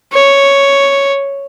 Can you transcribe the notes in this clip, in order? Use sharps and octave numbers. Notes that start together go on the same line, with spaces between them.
C#5